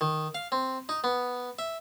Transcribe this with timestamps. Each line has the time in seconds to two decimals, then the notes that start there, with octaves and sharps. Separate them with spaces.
0.01 D#3
0.35 F5
0.52 C4
0.89 D#4
1.04 B3
1.59 E5